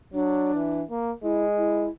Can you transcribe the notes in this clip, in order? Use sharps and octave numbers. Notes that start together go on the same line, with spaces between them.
F#3 D4
E3
A#3
G#3 E4
E4